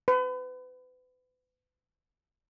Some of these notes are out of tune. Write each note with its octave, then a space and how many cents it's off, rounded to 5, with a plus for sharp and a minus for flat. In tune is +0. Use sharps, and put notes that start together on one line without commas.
B4 +35